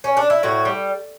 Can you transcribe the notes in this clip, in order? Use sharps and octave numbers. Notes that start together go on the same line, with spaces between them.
C#4
D4
E4
A2 F#4
G3